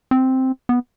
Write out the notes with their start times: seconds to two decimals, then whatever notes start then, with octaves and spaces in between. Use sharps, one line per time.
0.11 C4
0.69 B3